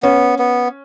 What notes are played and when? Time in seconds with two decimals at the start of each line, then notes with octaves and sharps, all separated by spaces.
0.03 B3 C#4
0.39 B3